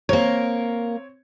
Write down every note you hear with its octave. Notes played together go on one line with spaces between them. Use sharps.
A#3 C4 A#4 C#5